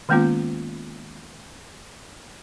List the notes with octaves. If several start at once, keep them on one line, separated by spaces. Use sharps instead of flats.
D#3 G#3 A#3 B3 C#4 F4